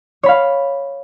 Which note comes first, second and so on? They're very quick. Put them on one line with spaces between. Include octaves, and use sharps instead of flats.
C#5 B5 F5